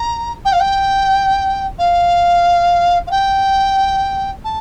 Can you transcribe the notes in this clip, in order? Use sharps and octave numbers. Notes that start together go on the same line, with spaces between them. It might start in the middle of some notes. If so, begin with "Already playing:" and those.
Already playing: A#5
G5
F5
G5
F5
F5
G5
A5